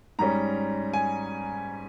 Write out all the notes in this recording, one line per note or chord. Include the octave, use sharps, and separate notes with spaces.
G#2 G3 C#4 A#5
G#5